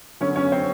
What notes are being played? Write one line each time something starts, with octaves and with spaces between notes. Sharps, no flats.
D3 F#3 B3 C#4 C#5
C#4 C#5
C4 C5